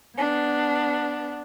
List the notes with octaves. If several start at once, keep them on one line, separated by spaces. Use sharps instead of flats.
B3 D4